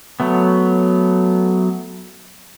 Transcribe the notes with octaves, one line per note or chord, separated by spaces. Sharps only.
F#3 A3 B3